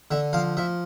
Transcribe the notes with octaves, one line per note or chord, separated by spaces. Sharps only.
D3 E5
F3 F5
F3 E5